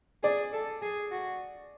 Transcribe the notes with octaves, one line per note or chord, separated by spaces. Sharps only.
G#4 D5
A4
G#4
F#4